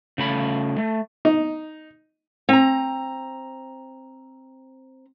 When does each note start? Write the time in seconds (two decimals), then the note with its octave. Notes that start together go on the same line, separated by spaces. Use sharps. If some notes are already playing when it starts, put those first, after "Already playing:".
0.18 C#3 A3 B5
0.78 A3
1.25 D#4
2.49 C4 A#5